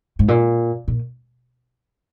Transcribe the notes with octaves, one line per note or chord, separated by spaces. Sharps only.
G#2
A#2
A#2